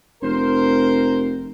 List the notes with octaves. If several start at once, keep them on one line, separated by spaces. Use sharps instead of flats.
F1 A#4 C5